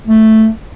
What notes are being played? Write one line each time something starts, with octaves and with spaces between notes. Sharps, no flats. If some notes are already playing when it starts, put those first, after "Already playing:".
A3